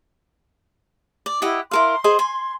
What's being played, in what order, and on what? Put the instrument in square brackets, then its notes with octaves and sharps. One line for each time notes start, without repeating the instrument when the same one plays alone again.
[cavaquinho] D5
[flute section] E4 [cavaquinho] G4 D#5 F#5
[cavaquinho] E4 A#4 F5 [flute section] C6
[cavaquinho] G#4 C5 D#5
G#5